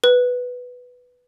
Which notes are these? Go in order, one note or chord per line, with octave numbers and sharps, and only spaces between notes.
B4